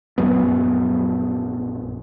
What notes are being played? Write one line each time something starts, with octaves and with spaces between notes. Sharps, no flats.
A#1 F#2 F#3 B3